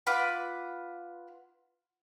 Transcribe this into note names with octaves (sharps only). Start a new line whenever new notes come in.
F4 B4 F#5 D6